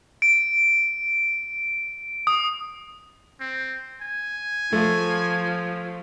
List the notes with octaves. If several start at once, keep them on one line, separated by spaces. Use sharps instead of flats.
D7
D#6
C4
G#5
F3 A3